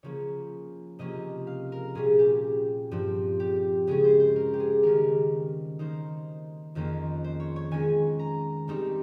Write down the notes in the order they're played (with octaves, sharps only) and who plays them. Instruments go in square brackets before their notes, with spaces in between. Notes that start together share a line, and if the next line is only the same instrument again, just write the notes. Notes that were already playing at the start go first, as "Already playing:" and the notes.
[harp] C#3 F3 A#3 C#4 C#5
C3 F3 A#3 C#4 D#5
F5
A#4
A#2 G3 C#4 G#4
G4
G2 F3 C4
G4
C#3 G#3 C#4 G#4
C5
C5
A#4
G4
G#4
D#3 G3 C#4 A#4
D#3 A#3 D#4 C5
F2 D#3 A#3 C#4 C5
C5
C#5
C#5
D#3 G#3 C#4 G#5
A#5
D#3 G3 C4 D#4